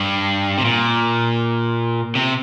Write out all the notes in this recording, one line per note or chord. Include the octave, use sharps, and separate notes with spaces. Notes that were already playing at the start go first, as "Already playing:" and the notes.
Already playing: G2
C3
A#2
C3